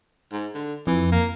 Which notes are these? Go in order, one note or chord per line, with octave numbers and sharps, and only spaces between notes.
G#2
D3
F2 E3
A#3